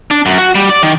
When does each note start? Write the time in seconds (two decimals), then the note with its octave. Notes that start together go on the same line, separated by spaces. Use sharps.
0.11 D4
0.26 F#2
0.38 F#4
0.55 G3
0.69 D5
0.83 D#3